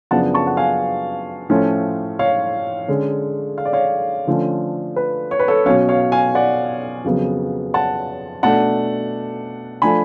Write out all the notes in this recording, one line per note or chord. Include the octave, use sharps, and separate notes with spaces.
F#2 C#3 F3 B3 D4 F#5 A5
A5 C#6
F#5
F5 G#5
A2 F3 A3 C#4 F4
C#5 F5
D3 G#3 C#4
F5
D5
C#5 F5
D3 F3 A3 C#4
B4
C#5
B4
A4 C#5
B2 F#3 C#4 C#5 F5
C#5 F5
F5 G#5
D5 F#5
F2 C#3 F#3 B3
F#5 A5
B2 A3 D4 F#5 A5
F3 A3 D4 G#5 B5